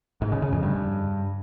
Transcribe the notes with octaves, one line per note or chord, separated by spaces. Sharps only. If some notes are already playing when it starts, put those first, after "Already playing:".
G#2
C#3
C#3
F2
G2